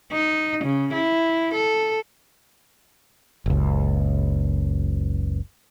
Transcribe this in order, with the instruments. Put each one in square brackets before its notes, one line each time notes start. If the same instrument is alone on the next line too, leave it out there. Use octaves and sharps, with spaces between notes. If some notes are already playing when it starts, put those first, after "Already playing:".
[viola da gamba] D#4
C#3
E4
A4
[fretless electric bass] F#1 C#2